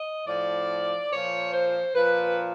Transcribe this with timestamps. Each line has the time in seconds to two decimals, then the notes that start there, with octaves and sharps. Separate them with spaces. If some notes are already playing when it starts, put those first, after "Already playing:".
Already playing: D#5
0.27 A2 F3 D5
1.12 A#2 F3 C#5
1.54 C5
1.95 A#2 F3 B4